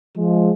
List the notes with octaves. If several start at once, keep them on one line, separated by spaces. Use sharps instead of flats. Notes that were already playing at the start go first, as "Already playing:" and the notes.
F3 G#3